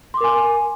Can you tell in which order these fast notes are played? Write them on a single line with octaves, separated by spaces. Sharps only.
C6 D6 A#4 G#5